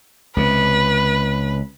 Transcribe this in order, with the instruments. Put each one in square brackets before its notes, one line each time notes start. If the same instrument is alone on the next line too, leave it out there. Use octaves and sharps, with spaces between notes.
[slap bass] C#2 C3 [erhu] B4